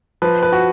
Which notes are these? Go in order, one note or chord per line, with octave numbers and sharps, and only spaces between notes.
F3 B4
B4
F#4